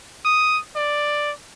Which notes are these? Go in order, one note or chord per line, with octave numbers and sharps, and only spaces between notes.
D#6
D5